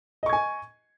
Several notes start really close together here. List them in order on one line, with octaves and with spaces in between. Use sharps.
D#5 C#6 G#6 G#5